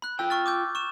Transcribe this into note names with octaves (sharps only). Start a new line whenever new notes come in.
B5 F#6
F4 G5 E6
C#6 F6 A6
D6 E6 G6
C#6 E7